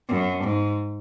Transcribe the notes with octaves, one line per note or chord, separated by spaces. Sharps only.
F#2
G#2